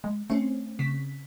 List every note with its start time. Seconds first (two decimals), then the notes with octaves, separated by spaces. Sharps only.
0.04 G#3
0.30 A3 C4 C#4
0.79 C#3 B6